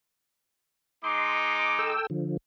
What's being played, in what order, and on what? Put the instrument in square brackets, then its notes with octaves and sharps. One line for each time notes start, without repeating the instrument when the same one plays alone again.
[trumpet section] G#3 D#4 D6 [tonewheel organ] C6
[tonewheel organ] A4 G5 E6
D3 F3